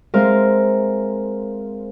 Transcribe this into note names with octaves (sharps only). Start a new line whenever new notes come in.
G#3 C4 A#4 C5 E5 F5